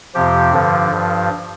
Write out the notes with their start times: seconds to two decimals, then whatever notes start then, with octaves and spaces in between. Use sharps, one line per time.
0.15 F2 C3 F3 G4
0.52 G2 D3 F3
0.91 G2 F3